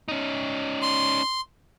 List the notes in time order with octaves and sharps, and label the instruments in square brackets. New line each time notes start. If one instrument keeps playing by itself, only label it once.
[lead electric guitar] C#4 D#4
[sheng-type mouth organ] C6